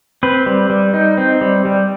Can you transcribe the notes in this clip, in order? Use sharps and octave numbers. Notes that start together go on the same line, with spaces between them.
C4 B4
G3
G3
D#4
C4
G3
G3